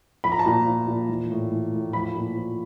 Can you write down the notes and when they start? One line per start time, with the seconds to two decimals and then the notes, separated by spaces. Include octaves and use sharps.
0.24 F3 B5
0.32 A#5
0.39 A5
0.46 A#2 A#5
0.67 F3
0.87 A#2
1.09 E3
1.31 A2
1.51 E3
1.73 A2
1.93 F3 B5
2.15 A#2
2.36 F3